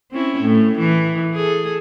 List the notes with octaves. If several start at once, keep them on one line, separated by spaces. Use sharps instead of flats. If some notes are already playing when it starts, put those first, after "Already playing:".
C4 C#4 E4
A2
E3
G#4 A4